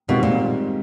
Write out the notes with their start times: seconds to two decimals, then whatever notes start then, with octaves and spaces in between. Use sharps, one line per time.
0.08 G#2 B2 D#3 G3 C4 F4
0.23 A#2